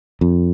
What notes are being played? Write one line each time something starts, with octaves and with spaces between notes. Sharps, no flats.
F2